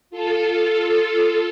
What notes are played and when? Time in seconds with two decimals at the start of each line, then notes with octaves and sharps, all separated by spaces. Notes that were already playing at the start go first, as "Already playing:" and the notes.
0.10 F4 A4